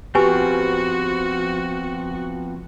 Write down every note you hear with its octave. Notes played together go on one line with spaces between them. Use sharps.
F3 B3 C4 F#4 G4 B4 G#5